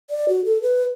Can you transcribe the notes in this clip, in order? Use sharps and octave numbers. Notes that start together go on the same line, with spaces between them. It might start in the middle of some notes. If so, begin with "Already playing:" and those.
D5
F#4
A4
B4